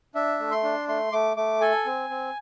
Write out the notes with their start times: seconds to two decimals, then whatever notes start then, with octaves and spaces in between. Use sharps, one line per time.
0.15 D4 E5
0.40 A3
0.51 C6
0.63 D4
0.88 A3 C6
1.12 A3 D6
1.37 A3 D6
1.61 A4 G#5
1.86 C4
2.10 C4